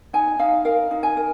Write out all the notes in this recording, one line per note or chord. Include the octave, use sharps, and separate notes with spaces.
D#4 G#5
D#4 F5
A#4 F5
D#4
G#5
A#4